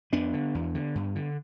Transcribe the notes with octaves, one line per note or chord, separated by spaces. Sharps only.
F2 B3 D4
D3
E2
D3
G2
D3